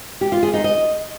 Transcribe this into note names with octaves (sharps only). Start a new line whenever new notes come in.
G4
F4
G#4
D#4
D#5